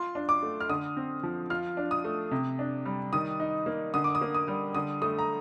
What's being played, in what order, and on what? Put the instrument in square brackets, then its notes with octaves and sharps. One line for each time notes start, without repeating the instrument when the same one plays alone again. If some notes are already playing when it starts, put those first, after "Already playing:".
Already playing: [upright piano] F4 C6
D4
D6
A3
F6
D3 D#6
C4
F3
F4 F6
D4
D#6
A3
C3
D4
G3
D#3 D#6
D#4
A#3
D3 D#6
D6
D#6
A#3
D#6
G3
D3 D#6
A3 D#6
A#5